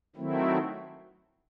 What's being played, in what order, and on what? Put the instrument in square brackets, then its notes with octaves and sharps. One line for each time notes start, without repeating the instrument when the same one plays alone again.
[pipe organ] D#3 F#3 A3 C4 E4